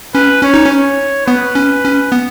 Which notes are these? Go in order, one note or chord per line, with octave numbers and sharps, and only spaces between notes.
C#4 B4
C#4 C#5
D#4
C#4
C#5
B3 B4
C#4
C#4
B3